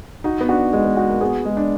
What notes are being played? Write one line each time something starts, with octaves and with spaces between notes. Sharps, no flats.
D#4 F#4
B3
D4 F#4
G#3 D4
B3
F#4
A#3
B3 G#4
G#3
D4